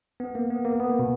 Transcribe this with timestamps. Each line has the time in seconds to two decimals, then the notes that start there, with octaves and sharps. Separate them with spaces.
0.20 B3
0.35 A#3
0.50 B3
0.65 A#3
0.80 B3
0.89 A#3
0.99 B2